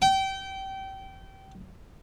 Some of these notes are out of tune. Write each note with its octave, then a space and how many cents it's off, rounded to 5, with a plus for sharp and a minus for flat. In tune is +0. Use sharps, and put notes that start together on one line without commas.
G5 -25